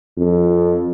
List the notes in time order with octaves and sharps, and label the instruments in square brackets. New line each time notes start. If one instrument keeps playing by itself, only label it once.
[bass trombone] F2